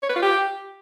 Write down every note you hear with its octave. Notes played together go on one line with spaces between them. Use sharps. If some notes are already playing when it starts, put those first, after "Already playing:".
C#5
B4
F4
G4